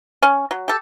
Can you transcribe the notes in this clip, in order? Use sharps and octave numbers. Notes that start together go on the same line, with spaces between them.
C#4
F#3
G4 A4